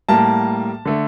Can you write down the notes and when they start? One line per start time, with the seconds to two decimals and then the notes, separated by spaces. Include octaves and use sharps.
0.09 A2 G3 A#3 A5
0.85 D3 A3